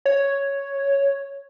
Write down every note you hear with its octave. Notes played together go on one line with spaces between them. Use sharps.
C#5